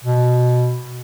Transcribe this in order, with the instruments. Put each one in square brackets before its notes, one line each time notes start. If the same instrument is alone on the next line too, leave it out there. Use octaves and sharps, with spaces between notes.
[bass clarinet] B2